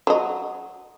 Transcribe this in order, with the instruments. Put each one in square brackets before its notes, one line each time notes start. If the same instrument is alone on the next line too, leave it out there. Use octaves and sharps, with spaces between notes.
[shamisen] F#3 D#5